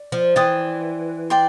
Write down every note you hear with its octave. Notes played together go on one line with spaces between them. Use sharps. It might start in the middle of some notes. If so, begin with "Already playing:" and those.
Already playing: D5
F3
E3 D5 G5 C6 D#6
D5 G5 C6